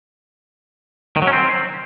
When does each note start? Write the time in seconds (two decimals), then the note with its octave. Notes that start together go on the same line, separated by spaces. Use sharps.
1.16 D#3
1.22 F#3
1.27 C#4
1.33 C4